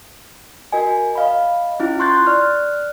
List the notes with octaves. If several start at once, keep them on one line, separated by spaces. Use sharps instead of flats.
F#4 A#4 D#5 G#5
D#5 F5 B5
C#4 E4 F4
C6 C#6 F#6 G6 A6
D5 F6 F#6